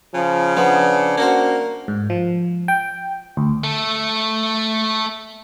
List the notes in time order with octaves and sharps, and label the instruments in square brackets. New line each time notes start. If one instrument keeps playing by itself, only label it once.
[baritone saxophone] C#3 [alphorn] F3
[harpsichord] F3 B3 [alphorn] D4
[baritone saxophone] A#3 [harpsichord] C#4 F#4 C5
[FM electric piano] G#2
F3
G5
D2
[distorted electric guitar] A3 A4